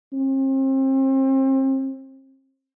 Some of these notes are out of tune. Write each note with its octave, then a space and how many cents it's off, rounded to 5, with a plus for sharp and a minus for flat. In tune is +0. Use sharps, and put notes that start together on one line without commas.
C4 +35